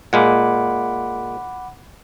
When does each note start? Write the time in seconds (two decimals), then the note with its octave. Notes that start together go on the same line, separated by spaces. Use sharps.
0.13 A#2 G#3 A#3 F#5 B5 D6